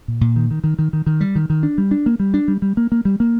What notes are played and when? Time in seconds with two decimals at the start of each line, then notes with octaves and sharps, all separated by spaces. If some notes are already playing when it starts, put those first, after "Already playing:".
0.08 A#2
0.21 A#2
0.36 D#3
0.51 D#3
0.64 D#3
0.79 D#3
0.93 D#3
1.07 D#3
1.21 G3
1.35 D#3
1.50 D#3
1.63 D4
1.78 G3
1.91 D4
2.06 A#3
2.20 G3
2.34 D4
2.48 G3
2.62 G3
2.77 A#3
2.92 A#3
3.05 G3
3.20 A#3